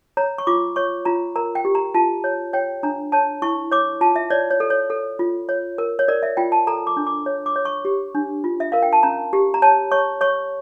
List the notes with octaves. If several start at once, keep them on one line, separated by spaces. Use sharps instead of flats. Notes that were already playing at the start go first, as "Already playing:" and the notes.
C#5 A#5
C#6
F4 D6
C#5 C#6
F4 A#5
A#4 A#5
G5
G4
A#5
F4 A5
C#5
C#5 G5
D4 A#5
C#5 A5
E4 C#6
C#5 D6
F4 A5
E5
C#5 D5
C#5
A4
C#5
A4
F4
C#5
A#4
C#5
A#4 D5
E5
F4 G5
A5
A4 A#5
D6
D4
D6
C#5
D6
C#5
C#6
G4
D4
F4
E5
A#4 F5
G5
A5
C#4 A#5
G4
A#5
C#5 A5
C#5 C#6
C#5 C#6